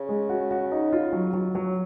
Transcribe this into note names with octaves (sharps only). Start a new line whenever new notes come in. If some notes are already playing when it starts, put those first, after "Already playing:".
Already playing: C#3
G#3
F#4
F#4
D#4
F4
F#3
F#3
F#3